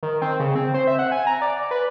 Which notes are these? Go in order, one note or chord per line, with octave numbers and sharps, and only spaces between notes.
D#3
C4
C#3
C4
C5
E5
F#5
G#5
A#5
D5
B4